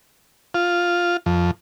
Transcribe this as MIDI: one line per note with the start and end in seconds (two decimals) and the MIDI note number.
0.54 1.17 65
1.26 1.51 41